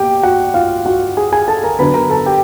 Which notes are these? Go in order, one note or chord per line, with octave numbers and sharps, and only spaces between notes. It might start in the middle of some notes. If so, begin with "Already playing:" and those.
Already playing: B2 A#3 G4 G5
F#4 F#5
F4 F5
F#4 F#5
G#4 G#5
G#4 G#5
A4 A5
A#4 A#5
D3 F#3 B3 D4 B4 B5
A#4 A#5
A4 A5
G4 G5